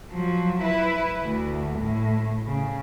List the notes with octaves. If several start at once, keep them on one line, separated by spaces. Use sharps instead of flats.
F3 F#3
E4 B4
D2
A2
C#3